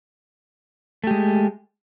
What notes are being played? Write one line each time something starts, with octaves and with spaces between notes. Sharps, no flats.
G#3 A3 G4